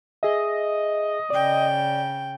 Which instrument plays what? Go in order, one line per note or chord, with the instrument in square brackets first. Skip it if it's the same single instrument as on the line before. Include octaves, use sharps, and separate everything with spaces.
[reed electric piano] G#4 E5 [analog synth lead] D#5
[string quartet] C#3 G5 [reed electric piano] D5